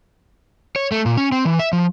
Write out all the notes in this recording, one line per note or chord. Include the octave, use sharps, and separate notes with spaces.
C#5
A3
A#2
C#4
C4
E3
E5
F3